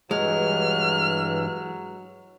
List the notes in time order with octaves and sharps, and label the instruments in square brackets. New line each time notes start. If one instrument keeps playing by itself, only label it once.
[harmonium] G2 E3 [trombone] F#3 [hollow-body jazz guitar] G#3 [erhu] F6